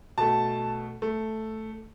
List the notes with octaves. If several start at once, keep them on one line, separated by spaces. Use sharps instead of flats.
B2 A3 A5
A3